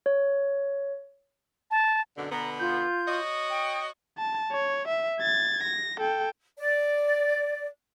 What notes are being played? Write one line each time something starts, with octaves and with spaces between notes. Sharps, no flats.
C#5
A5
F#2 B2 D3
B2 D3 B3 A#5
F4 G6
F#4 C#5 D#5
G5
A5
C#5
E5
G#6 A6
A#6
A4 G5
D5